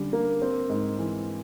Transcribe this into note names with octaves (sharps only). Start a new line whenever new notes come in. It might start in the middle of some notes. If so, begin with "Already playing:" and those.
Already playing: D3 G3 C#4
A#3
C4
G#2
E3